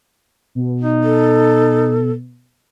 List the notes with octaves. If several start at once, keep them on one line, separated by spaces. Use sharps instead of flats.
B2
D#4
A4